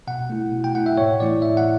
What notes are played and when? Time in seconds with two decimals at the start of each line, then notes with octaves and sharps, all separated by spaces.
0.07 B2 F#5
0.30 A3 E4
0.52 B2
0.64 G5
0.75 A3 E4 F#5
0.86 E5
0.98 A2 C#5
1.20 E3 A3 E4 D5
1.42 A2 E5
1.57 F#5